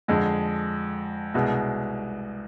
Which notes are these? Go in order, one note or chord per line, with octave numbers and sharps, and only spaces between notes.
F2 D3 G#3
C2 B2 G#3